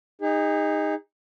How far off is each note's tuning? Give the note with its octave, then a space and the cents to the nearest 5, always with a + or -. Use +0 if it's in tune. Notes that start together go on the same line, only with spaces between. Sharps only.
D#4 +0 G#4 -40